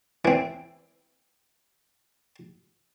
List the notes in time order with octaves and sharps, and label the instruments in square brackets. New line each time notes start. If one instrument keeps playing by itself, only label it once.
[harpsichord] E3 C4